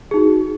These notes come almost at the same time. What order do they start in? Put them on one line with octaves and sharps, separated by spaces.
G#4 D#4 F#4